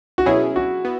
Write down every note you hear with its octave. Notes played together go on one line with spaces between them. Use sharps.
F#4
B2 F#3 C#4 E4 G#4
F#4
B3